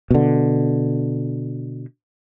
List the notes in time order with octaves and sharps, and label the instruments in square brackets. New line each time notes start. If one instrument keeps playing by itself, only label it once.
[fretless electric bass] B2 D3